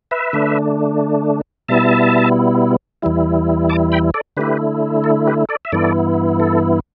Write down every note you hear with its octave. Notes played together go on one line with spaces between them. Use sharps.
B4 E5
D3 A3 D4
B2 G3 B3 E4 E5 A5
E2 E3 G3 E4
A5 D6
G5 B5
A4 D5
D3 A3 E4 G4 B4
A4
G4 B4
A4 D5
E5
G2 E3 B3 E4 A4 D5
A4